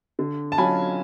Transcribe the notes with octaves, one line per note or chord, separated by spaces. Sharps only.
D3
A5
F#3 C#4 F4 G#5 B5